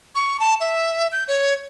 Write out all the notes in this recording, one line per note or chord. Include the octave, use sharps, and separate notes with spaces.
C#6
A5
E5
G6
C#5